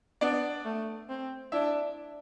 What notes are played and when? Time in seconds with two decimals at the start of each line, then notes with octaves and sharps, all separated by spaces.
0.21 B3 D4 D5
0.65 A3
1.09 C4
1.52 D4 E4 E5